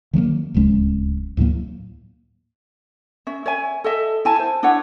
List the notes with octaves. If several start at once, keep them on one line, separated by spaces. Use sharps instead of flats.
D#3 F#3 G#3 A#3
D1 C#2 G#3 C#4
D2 A2 F#3 A#3
C#4 E5
C#5 E5 G#5
A4 D#5 E5
E4 G#5 A5
C5
D4 E4 C#5 F#5